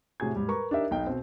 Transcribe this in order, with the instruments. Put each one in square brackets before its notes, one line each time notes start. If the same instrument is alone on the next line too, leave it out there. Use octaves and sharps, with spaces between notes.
[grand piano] A2 C3 F#4 G#4 G#6
G#2 G3
A#4 B4 A#5 C#6
D4 D#4 G4 A#4 E5
B1 D#4 G5
B2 C4